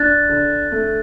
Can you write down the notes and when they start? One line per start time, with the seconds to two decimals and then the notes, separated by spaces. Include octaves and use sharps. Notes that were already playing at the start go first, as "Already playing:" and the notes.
Already playing: D4 F#6 A6
0.29 D3
0.72 A3